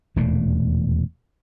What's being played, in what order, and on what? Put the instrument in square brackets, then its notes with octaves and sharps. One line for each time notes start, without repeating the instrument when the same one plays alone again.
[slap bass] E1 D#2 A#2 A3